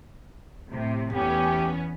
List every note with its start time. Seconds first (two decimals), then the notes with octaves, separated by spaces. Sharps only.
0.71 A2 C3
1.14 E2 A3 B3 C#4 G4